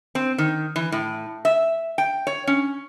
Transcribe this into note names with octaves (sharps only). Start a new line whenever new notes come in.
C4
D#3
E3
A2
E5
G5
C#5
C#4